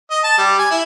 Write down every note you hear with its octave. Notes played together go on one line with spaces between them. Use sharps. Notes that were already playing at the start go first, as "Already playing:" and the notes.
D#5
A5
G3
G#5
E4